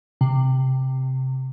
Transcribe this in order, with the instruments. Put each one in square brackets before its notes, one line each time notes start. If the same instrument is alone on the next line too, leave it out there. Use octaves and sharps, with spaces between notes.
[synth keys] C3